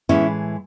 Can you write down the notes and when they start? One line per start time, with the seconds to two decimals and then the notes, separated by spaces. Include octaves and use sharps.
0.09 A2 E3 G#3 B3 C#4 E4